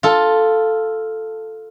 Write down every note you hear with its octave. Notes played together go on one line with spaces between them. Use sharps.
F4 A4